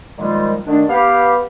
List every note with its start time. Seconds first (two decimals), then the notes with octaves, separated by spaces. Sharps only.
0.18 A#2 D#3 F3 G3 G#3 F4
0.67 D3 D#3 A3 D4
0.89 B3 G4 F5